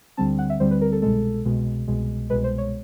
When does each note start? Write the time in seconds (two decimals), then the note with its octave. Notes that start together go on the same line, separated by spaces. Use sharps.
0.17 D2 D3 G3 C4 A5
0.38 F#5
0.50 E5
0.60 D2 D3 G3 C4 C5
0.71 B4
0.81 A#4
0.92 A4
1.02 C2 B2 G#3 A4
1.45 C2 B2 G#3
1.88 C2 B2 G#3
2.30 C2 B2 G#3 B4
2.44 C5
2.58 C#5